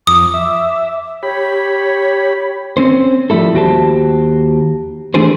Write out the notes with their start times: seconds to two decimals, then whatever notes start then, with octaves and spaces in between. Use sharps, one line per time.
0.07 F2 D6 D#6
0.34 E5
1.23 G4 C#5 B5
2.77 C4 C#4 C5
3.30 F3 G3 A3 E4 A4
3.54 D#2 F#4 G4 C5 A5
5.14 E3 A3 D4 G4 G#4 C5